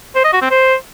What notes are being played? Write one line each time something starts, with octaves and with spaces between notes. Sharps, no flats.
C5
D#5
F#4
C4
C5